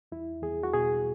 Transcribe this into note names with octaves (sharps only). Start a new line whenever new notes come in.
E2 E4
E2 G#4
F#4
B2 G#4